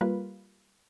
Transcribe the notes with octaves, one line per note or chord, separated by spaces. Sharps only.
G3 A#3 F4 B4